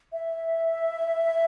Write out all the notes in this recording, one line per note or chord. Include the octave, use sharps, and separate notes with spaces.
E5